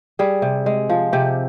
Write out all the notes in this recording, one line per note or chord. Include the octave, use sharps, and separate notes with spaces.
G3 G#4
C3
G#3
F3
C3 G4